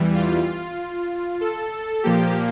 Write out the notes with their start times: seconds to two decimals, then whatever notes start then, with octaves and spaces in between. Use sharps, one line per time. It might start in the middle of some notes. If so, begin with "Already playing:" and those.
Already playing: E2 E3 G3
0.14 F4
1.41 A4
2.03 A#2 F3 A#3 G4